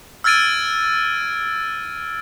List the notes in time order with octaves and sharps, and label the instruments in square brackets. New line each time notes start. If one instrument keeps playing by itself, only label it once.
[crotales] E6 F6 G#6 A6 D7 D#7